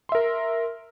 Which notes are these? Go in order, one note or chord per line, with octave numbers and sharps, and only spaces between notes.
A#4 E5 C6